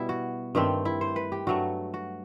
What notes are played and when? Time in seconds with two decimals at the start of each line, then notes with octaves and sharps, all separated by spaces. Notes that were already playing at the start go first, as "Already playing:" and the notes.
Already playing: B2 G3 B3 E4
0.09 F#4
0.55 G2 D#3 A3 C4 G4
0.85 E4
1.01 C5
1.16 B4
1.32 G4
1.47 G2 F#3 A3 F#4
1.94 F#4